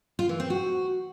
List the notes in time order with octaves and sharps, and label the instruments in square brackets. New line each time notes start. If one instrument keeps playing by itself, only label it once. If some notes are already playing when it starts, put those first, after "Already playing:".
[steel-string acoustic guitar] F4
E3
C4
F#4